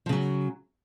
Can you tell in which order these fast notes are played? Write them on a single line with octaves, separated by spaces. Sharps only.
F3 C#3 F#3